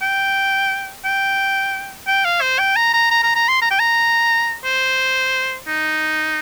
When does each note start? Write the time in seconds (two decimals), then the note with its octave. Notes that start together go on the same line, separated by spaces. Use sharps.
0.02 G5
1.05 G5
2.07 G5
2.25 F5
2.41 C5
2.59 G5
2.76 A#5
2.93 A#5
3.10 A#5
3.23 A#5
3.35 A#5
3.49 C6
3.62 A#5
3.71 G5
3.80 A#5
4.64 C5
5.67 D#4